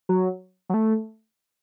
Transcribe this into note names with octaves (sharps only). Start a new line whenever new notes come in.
F#3
F#3
A3